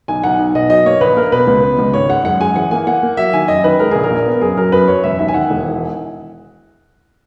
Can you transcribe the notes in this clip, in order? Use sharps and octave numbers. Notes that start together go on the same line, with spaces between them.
B1 G#5
B1 F#5
B1
B2 D#5
F#3 D#5
A#3 C#5
A#1 B4
A#3 A#4
B2 B4
C#2
B3
C#2
G#1 C#5
G#3 F#5
F#2 F#5
G#3 G#5
E3 F#5
A#3 G#5
A#3 F#5
A#3
F#3 E5
D#3 G#5
F#2 D#5
D#3 B4
G#3 A#4
A#1 G#4
A#4
A#2
B3
F#2 G#4
F#3 A#4
F#2 B4
F#2 C#5
E1 E5
D#2 E5
G#5
D#3 F#5
E1
E3